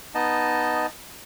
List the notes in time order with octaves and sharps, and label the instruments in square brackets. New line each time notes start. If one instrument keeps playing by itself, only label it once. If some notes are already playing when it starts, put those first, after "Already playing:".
[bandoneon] B3 D#4 D#5 A5